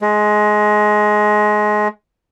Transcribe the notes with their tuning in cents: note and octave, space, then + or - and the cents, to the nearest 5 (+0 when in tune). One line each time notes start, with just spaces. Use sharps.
G#3 +20